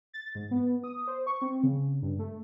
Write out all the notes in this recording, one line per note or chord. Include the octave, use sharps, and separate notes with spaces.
A6
G#2
B3
D#6
C5
C#6
C4
C#3
G2
A3